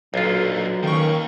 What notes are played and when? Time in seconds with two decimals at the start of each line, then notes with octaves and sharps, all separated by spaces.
0.14 B1 A#2 D3 F#3 F4
0.83 D#3 A#3 C#4 G5 C#6